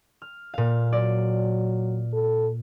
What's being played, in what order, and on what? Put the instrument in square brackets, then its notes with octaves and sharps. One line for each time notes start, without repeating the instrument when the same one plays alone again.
[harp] F6
A#2 F5
[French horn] F#3 [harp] D5
[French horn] A4